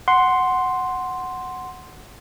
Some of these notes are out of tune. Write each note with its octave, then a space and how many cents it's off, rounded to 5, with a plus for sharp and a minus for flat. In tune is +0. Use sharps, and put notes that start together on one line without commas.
F#5 +0 C6 +0